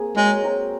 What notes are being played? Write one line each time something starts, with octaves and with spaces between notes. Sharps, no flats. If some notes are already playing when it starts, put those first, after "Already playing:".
Already playing: A#3 C4 G#4
F#3 G#3
C4 F#4 A#4